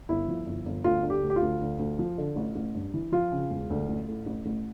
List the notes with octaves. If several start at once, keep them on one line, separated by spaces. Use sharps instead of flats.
G1 E4
F3
G1
G1
D2 F4
D3
G4
D2
G4
F4
D2
D2
D2
F3
D3
A1
A1
G2
E3
F3 F4
C#3
E1
D2
A1
A2
A1
A1